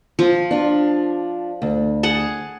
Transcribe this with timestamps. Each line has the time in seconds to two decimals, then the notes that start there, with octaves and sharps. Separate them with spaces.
0.19 F3 F4
0.51 D4 F4
1.62 D2
2.03 G#4 F#5 A5